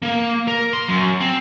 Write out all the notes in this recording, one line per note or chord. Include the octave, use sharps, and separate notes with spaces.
A#3
A#4
C6
F#2
C4